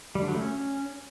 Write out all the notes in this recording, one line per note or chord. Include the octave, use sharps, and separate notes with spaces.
G3
D3
F#3
A3
C#4